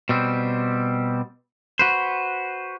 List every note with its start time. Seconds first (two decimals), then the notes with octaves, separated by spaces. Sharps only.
0.09 B2 G3 C4
1.79 F#4 B4 C5